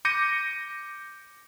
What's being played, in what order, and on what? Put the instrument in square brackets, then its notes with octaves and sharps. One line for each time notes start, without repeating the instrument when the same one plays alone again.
[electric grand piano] D6 G6 A#6 C#7 D#7